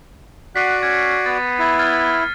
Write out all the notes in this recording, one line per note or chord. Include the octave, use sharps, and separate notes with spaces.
F#4 D5 F#5 B6 C7 D#7
C#4 G#6 C#7
B3 A6
E4 G#6 A6
F6 G#6 A6